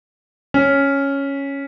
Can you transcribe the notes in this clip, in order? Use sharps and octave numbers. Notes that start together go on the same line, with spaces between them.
C#4